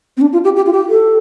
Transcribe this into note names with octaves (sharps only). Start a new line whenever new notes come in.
C4
D4
F4
G4
G4
F4
G4
A4